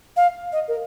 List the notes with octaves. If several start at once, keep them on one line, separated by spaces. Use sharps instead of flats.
F5
D#5
A#4